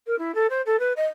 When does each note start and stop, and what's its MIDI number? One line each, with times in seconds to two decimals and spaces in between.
0.07 0.18 70
0.19 0.34 64
0.35 0.47 69
0.50 0.62 72
0.66 0.79 69
0.79 0.93 71
0.97 1.06 75